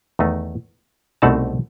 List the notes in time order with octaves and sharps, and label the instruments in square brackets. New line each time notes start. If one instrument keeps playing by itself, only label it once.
[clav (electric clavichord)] E2 D#3 A3 D#4
C2 B2 A3 C4 D#4 F#5 A5